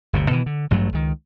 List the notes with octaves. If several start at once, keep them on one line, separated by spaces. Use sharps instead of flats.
G1 D2 C3
B2 D#3 E3
D3
A1 G2 F#3 A3
C#2 D#3